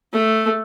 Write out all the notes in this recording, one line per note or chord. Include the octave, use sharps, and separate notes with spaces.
A3